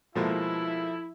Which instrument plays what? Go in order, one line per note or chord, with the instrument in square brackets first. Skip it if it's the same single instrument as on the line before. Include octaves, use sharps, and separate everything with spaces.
[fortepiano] B2 G#3 A#3 [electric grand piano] F3 A4 [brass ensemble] E4